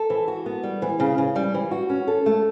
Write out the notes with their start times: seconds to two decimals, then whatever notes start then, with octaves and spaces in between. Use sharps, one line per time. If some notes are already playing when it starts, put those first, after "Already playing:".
Already playing: A4
0.10 E3
0.28 F#4
0.46 B3
0.63 G3
0.82 E3
1.00 C#3
1.18 C#3
1.36 G3
1.54 E3
1.71 F#4
1.90 C#4
2.08 A4
2.26 A3